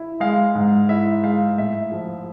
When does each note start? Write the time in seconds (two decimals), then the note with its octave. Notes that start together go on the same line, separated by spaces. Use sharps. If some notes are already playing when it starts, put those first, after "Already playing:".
Already playing: E4
0.20 G#3 F5
0.55 G#2
0.89 E4 E5
1.23 G#3 F5
1.57 A2 E5
1.92 F3